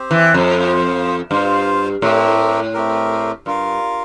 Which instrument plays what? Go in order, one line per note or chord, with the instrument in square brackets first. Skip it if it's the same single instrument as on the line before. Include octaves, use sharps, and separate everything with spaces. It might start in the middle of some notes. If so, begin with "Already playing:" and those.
Already playing: [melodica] C4 G4 C5
[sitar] E3
F2
[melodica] F4 C5 F5
[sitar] G2 [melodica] F4 C5 F5
[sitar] A2 [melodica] A3 C4 G4 A#4
[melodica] A3 C4 G4 A#4
[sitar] G2 [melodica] F4 A#4 F5